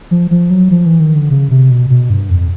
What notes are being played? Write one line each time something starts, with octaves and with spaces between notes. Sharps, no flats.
F3
F3
F#3
F3
E3
D#3
D3
C#3
C3
B2
B2
G2
F2